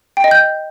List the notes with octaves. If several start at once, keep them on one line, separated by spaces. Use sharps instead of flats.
G5
D#5
G6